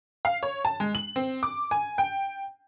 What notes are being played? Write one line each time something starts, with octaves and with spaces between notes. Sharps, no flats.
F5
C#5
A5
G#3
F#7
C4
D6
G#5
G5